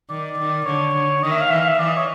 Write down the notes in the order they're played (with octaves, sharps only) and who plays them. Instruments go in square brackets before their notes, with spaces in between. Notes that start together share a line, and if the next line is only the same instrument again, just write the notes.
[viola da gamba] D#3 [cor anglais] D5
[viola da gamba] D#3
[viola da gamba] D3 [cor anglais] C#5
[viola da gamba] D3
[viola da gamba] D#3 [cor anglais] D#5
[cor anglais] E5
F5
[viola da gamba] E3 [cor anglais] E5
[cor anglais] F5
E5
[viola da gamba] E3 [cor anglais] D5
[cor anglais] D#5
C#5